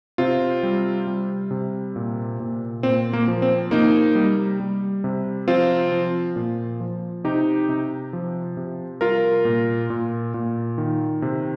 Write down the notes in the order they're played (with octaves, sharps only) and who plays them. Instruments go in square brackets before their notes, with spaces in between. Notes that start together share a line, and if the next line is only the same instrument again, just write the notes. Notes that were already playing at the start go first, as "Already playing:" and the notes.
[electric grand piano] C3 C4 F4
G3
G3
C3
A#2
A#2
A#2 C4
A#3
F3
C4
C3 A#3 D#4
G3
G3
C3
F3 C4 F4
F3
A#2
F3
C3 D#4 G4
C3
F3
C3
G3 F4 A#4
A#2
A#2
A#2
D#3
C3